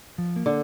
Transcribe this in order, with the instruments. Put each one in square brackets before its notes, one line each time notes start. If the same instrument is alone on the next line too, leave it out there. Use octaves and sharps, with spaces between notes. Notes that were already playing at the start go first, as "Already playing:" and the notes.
[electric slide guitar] F3
A#3
[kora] D3